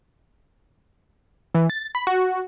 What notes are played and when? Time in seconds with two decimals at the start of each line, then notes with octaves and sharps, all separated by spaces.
1.55 E3
1.70 A6
1.95 B5
2.07 F#4